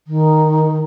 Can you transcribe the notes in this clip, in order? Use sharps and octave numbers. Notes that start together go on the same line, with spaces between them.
D#3